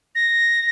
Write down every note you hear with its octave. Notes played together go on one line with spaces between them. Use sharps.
A#6